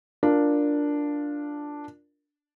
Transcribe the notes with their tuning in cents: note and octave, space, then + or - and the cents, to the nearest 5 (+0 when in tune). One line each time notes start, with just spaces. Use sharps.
D4 +0 F4 +0 A#4 +0